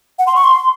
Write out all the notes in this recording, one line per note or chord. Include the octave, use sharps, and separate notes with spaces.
F#5
C6
C#6
C6